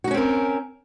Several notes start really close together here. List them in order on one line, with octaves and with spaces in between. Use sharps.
F#4 D#4 C#4 C4 A#4